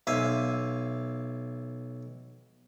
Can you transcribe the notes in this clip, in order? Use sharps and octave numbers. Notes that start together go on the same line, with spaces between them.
B1 E5 F5 G#5